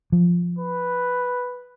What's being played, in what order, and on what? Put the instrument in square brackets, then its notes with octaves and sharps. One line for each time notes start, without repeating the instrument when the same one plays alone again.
[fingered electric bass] F3
[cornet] B4